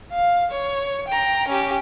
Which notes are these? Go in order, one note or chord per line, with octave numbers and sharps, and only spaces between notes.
F5
C#5
G5 A#5
C#4 G4